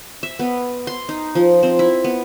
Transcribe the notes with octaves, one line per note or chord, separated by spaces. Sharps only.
E5
B3
C6
D#4
F3
C4
E4
B3